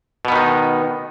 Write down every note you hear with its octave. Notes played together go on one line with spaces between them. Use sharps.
B2 D#3 B3 D#4